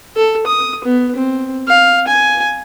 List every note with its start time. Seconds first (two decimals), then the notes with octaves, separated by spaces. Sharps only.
0.16 A4
0.47 D#6
0.84 B3
1.15 C4
1.68 F5
2.07 G#5